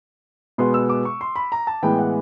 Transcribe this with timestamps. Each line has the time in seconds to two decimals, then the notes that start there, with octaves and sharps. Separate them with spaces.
0.58 B2 G#3 B3 C6
0.74 E6
0.89 D6
1.05 C#6
1.21 C6
1.36 B5
1.52 A#5
1.67 A5
1.83 A2 E3 G#3 B3 G5
1.99 F#5